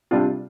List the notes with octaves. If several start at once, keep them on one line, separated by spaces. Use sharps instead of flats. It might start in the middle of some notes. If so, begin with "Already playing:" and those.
C3 G3 D4 F4